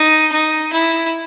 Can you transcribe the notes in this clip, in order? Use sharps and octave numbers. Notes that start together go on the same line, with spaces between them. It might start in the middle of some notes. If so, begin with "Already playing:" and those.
Already playing: D#4
D#4
E4